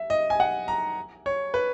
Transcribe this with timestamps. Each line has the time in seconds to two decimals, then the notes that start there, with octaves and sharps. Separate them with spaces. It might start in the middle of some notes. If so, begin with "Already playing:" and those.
Already playing: E5
0.10 D#5
0.30 G#5
0.40 F#5
0.68 A#5
1.26 C#5
1.54 B4